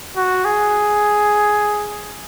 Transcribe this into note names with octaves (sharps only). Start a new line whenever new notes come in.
F#4
G#4